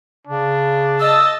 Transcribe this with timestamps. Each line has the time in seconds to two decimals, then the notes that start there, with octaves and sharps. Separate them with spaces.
0.27 C#3 D4
1.00 D#5 A5 E6